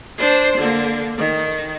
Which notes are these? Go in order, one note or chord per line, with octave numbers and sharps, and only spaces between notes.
D4 C5
D3 A#3
D#3